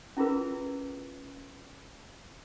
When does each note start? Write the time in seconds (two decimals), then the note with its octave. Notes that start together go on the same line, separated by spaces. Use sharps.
0.17 C#4 E4 F4 G#4 A#4 B4